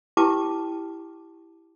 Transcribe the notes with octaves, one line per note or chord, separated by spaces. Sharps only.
E4 G4 B4 G5 A5 D6